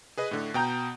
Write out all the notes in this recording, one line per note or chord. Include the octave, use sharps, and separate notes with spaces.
G#4 B4 D#5
A2 D3
B2 G5 A#5 G6